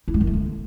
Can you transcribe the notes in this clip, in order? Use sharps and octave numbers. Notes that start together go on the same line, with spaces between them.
E4
G#3
D#3
A3
D3